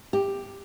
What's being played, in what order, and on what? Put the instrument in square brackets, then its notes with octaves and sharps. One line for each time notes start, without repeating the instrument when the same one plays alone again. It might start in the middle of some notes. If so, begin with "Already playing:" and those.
[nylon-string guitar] G4